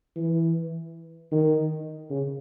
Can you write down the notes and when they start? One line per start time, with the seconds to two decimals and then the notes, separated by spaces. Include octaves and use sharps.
0.16 E3
1.32 D#3
2.10 C#3